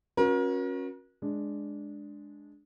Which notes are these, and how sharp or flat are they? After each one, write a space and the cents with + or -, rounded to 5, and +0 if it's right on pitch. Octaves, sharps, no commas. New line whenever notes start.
C#4 -20 F#4 -25 A#4 +35
G#3 +5 D4 +0